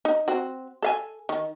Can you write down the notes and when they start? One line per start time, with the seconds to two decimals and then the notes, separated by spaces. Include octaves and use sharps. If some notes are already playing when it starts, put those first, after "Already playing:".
0.05 D#4
0.28 C4 F#4
0.83 A4 F5 G#5
1.29 D#3